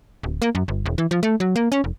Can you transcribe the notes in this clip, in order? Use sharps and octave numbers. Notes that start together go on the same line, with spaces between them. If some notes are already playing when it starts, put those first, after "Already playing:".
D1
A#3
F#2
G1
E1
E3
F3
A3
F#3
A#3
C#4
F1